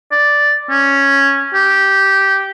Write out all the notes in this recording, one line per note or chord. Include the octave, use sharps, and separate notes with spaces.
D5
C#4
G4